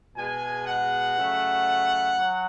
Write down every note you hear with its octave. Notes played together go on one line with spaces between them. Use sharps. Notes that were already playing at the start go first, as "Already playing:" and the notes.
B2 G#3 G#5
F#5
C#3 F#3 A3
F#3